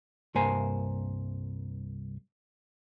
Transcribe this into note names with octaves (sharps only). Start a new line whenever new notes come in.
C2 G2 A#3 A#4 C5 G#5